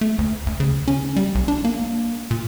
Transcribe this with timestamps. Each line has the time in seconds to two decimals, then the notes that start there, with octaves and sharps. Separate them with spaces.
0.01 A3
0.19 D2
0.47 D2
0.60 C#3
0.88 C#4
1.16 G3
1.35 B1
1.48 D4
1.65 A#3
2.31 A#2